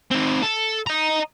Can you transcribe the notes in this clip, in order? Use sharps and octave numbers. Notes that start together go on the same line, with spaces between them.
C4 D#4
A4
D#5 A#5